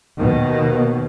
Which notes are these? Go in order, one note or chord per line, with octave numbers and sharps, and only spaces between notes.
D#2 B2 D#3